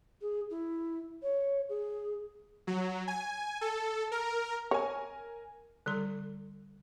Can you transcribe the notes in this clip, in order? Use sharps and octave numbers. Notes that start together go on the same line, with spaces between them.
G#4
E4
C#5
G#4
F#3
G#5
A4
A#4
A#4 C#5 G#5
D3 G3 A4 C6